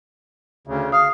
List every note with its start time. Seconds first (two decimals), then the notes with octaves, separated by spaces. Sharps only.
0.67 D2 C#3
0.92 F5 D#6